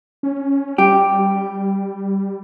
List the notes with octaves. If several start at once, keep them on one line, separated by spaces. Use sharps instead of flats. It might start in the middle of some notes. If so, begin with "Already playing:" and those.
C#4
G3 G4